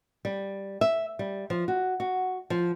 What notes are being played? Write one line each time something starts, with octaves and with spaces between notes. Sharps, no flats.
G3
E5
G3
F3
F#4
F#4
F3